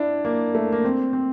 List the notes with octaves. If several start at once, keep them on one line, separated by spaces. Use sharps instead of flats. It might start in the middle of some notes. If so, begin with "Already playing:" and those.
Already playing: D4 E4
A#3
A3
A#3
C4
C4